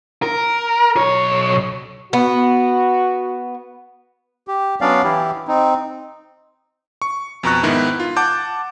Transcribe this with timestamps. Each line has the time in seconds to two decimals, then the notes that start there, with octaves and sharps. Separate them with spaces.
0.22 A#4
0.97 B1 C#5
2.13 B3 F#4
4.48 G4
4.81 F#3 B3 C#4 D4 D5 F5
5.04 E3 E4 G4
5.47 C4 D#4
7.02 C#6
7.43 F2 B2 A#5 C#6 F#6
7.63 G#2 D#3 B3 E4
8.00 F4
8.16 F#5 A5 D6 G6